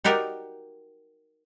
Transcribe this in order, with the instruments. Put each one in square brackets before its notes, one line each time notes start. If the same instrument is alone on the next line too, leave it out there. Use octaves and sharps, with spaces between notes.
[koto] D#4 F#4 G4 A#4 D5 D#5